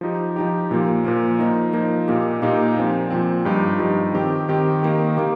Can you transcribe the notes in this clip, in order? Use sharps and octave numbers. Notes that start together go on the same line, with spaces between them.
F3 D#4 G4
F3 D#4 G4
A#2 F3 A#3
A#2 F3 A#3
F3 A#3 D#4
F3 A#3 D#4
A#2 A#3 D#4 G4
A#2 A#3 D#4 G4
A#2 F3 C4
A#2 F3 C4
G2 F3 D#4 G4
G2 F3 D#4 G4
D#3 C4 G4
D#3 C4 G4
D#3 A#3 G4
D#3 A#3 G4